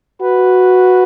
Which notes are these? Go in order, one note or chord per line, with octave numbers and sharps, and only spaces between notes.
F#4 B4